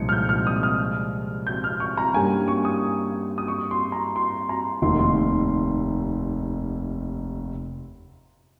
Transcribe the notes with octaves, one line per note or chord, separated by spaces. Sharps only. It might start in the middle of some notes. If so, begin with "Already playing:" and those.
Already playing: C2 A#2 F3 G#3 D#4 C#7
F6
G6
F6
D#6
F6
G6
F6
C#6
A#5
G2 G3 A#3 C#4 G4 G#5
C#6
D#6
D#6
C#6
C6
A#5
C6
A#5
F1 D#2 D#3 A#3 D#4 C6
C6